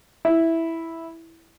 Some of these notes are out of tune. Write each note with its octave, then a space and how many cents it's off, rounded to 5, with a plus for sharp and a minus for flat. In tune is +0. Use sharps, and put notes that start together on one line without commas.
E4 -5